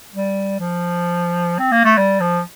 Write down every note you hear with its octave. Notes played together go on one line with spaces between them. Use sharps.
G3
F3
C4
A#3
A3
G3
F3